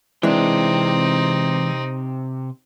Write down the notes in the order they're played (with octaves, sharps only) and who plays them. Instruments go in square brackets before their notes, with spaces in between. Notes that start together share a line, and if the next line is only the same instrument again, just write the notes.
[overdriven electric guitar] C3 G5 [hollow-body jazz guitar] E3 G#3 D4 [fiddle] C4 D#4